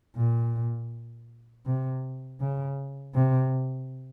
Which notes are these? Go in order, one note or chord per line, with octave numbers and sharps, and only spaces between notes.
A#2
C3
C#3
C3